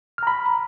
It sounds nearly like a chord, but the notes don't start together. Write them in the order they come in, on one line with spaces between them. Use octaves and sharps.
F6 A#5 B5